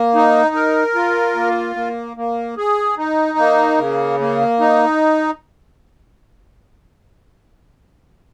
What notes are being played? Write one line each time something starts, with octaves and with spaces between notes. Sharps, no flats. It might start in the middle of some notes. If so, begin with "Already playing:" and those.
Already playing: A#3
D#4
A#4
F4
A#3
A#3
A#3
G#4
D#4
A#3
C#3
A#3
D#4